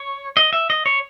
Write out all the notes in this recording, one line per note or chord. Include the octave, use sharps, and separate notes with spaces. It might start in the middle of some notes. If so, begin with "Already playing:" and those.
Already playing: C#5
D#5
E5
D#5
C#5